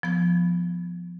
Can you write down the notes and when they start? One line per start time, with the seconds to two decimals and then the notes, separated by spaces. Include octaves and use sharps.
0.03 F3 B3 G#6